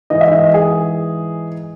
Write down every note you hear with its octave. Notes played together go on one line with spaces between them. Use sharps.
G#2 E3 D#5
E5
D#5
G#4